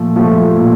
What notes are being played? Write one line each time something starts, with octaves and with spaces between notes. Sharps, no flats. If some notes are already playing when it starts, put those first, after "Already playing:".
Already playing: A#2 F3 A3
F3 A3
A#2